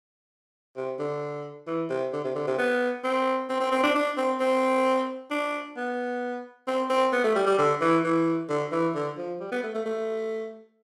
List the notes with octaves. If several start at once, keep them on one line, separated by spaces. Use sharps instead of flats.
C3
D3
E3
C3
D3
C3
D3
C3
B3
C4
C4
C4
C4
D4
D4
C4
C4
D4
B3
C4
C4
B3
A3
G3
G3
D3
E3
E3
D3
E3
D3
F3
G3
B3
A3
A3
A3